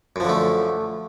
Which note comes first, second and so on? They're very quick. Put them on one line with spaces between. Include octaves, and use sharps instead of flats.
F#2 F3 D3 A3